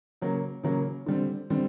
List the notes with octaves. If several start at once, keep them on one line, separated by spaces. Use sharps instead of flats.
C#3 F#3 A#3
C#3 F#3 A#3
D3 G3 C4
D3 G3 C4